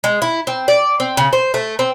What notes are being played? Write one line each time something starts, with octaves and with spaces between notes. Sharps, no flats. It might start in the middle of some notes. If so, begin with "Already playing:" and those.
G#3
E4
C4
D5
C4
C#3
C5
A3
C4